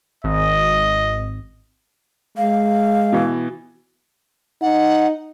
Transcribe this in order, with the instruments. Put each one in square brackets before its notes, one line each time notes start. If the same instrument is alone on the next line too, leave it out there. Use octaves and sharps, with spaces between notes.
[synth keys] G#1 [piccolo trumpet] D#5
[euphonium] G#3 [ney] F5
[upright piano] B2 E3
[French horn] D#4 [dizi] F#5